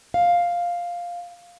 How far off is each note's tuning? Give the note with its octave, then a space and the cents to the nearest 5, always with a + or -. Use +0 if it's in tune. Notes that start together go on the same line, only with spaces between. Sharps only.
F5 +5